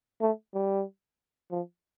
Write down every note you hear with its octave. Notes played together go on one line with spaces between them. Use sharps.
A3
G3
F3